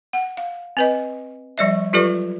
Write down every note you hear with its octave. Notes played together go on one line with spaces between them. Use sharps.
F#5
F5
C4 B4 D#5
F3 G3 D5 E5
F#3 F4 G4 A4 B4 D5